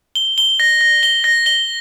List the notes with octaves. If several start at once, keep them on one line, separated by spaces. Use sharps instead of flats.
G7
G7
A#6
A#6
G7
A#6
G7